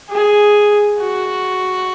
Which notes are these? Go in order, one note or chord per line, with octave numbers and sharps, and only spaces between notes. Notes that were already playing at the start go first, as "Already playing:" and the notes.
G#4
F#4